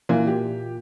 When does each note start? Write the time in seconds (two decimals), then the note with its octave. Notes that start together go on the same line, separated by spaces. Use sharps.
0.09 A#2 E3
0.27 G4